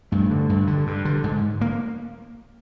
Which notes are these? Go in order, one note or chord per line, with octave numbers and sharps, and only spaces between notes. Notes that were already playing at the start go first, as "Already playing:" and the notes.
G2 A3
D3
G2
D3
G2
D3
G#2
A#3